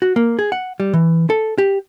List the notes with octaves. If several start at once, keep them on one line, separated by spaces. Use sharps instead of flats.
F#4
A#3
G#4
F#5
G3
E3
A4
G4